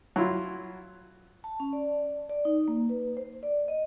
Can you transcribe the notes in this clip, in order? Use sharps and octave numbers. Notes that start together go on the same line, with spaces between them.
F#3 E4 F4
A5
C#4
D5
D5
D#4
A#3
B4
C5
D5
D#5